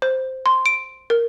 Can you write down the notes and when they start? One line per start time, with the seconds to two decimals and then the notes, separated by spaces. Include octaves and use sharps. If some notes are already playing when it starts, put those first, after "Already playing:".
0.02 C5
0.46 C6
0.66 D7
1.10 A#4